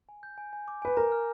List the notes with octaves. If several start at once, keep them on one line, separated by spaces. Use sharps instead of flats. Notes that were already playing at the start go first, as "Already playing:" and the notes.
G#5
G6
G#5
G#5
D6
B4 G#5
A#4 A#5
F6